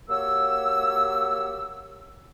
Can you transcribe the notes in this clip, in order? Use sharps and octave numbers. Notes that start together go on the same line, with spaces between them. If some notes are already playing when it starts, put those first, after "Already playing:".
A#3 F#4 G4 C#5 E6